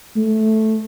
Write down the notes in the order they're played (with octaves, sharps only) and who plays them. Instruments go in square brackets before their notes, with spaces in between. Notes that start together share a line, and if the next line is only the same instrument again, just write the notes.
[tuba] A3